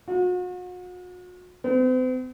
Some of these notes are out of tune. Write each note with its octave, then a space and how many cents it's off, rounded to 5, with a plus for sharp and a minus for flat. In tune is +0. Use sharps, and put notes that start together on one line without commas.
F#4 -40
C4 -45